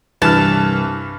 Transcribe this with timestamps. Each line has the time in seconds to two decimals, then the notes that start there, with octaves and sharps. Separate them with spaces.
0.22 C2 G2 E3 A5 F6